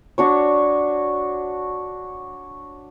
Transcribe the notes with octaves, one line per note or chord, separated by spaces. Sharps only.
D4 F#4 C#5